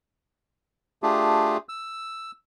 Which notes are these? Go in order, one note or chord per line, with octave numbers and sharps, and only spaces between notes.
A3 D4 F4 G4 G#4
E6